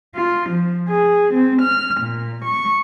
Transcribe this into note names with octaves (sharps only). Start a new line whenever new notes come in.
F4
F3
G#4
C4
F6
A#2
C#6